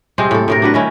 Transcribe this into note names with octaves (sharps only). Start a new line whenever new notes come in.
C3 G#3 C4
A2 A4
A2 C3 A#4
D4 F#4 B4
D#3 C#4 E4